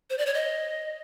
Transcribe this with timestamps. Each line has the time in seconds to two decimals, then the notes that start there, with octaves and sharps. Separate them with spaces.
0.10 C5
0.18 D5
0.26 C#5
0.34 D#5